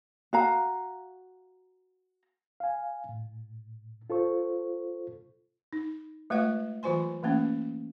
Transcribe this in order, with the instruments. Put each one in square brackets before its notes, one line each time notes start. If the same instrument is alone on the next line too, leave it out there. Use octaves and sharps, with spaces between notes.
[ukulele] F#4 F5 A#5
[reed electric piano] F5 G#5
A2
F4 A4 C5 C#6
[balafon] D#4
G#3 A3 F4 B4 D5 F#5
E3 F#3 F4 C5 G#5 C6
E3 A3 A#3 C#4